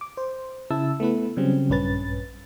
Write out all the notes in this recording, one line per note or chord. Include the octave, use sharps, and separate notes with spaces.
D6
C5
C#3 E4 A5 E6
A3 B3 E4 B4
C#3 F#3 G3 C4 C#4
A#1 G2 C#4 B4 A6